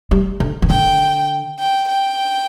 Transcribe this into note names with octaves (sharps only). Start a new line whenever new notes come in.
G3
D3
E3
D3 G5
G5
G5